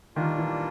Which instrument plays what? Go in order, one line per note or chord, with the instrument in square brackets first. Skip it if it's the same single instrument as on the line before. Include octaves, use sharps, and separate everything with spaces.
[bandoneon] A#2 G3 A#3 D4 F4 [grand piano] D#3
[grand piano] E3